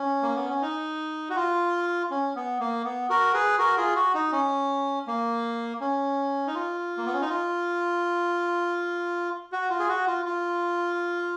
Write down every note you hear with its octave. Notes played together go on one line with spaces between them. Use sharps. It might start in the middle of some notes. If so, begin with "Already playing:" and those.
Already playing: C#4
A#3
B3
C#4
D#4
F#4
F4
C#4
B3
A#3
B3
F#4 A#4
G#4 B4
F#4 A#4
F4 G#4
F#4
D#4
C#4
A#3
C#4
D#4
F4
A#3
B3
C#4
D#4
F4
F#4
F4
G#4
F#4
F4
F4